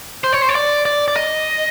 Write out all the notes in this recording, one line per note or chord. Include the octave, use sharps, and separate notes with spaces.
C5
C#5
C5
C#5
D5
D5
D5
D#5